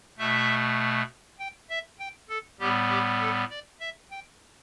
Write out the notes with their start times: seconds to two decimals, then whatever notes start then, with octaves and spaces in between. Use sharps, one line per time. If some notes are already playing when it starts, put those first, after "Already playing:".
0.18 B2 A3 E5
1.39 G5
1.70 E5
1.99 G5
2.29 A4
2.60 A2 G3 B3 G4
2.90 G4
3.20 A4
3.50 D5
3.80 E5
4.11 G5